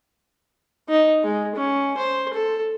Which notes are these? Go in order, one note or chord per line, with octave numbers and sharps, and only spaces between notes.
D#4
G#3
C#4
C5
A4